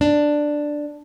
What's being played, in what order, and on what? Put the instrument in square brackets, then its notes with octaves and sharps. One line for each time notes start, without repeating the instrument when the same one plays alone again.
[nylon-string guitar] D4